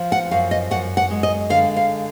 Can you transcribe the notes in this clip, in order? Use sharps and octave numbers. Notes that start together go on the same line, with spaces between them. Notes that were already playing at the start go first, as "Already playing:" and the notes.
Already playing: F3
F#5
F#2 F5
D#5
F#2 F#5
F#5
G#3
D#5
D3 F5
F5